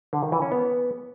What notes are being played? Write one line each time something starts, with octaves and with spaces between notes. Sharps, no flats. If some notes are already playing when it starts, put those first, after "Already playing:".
D3
D#3
E3
C#4
B3